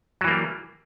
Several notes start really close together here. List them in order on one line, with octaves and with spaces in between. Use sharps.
F#3 E3 A#3 G3